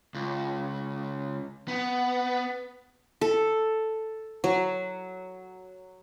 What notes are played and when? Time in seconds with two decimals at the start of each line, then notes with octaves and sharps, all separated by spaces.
0.14 C#2
1.68 B3
3.21 A4
4.44 F#3